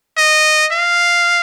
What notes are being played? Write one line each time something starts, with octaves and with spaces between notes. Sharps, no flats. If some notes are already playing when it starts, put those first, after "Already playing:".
D#5
F5